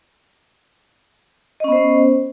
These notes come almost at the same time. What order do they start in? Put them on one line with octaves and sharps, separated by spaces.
D#5 C#4 B3 C5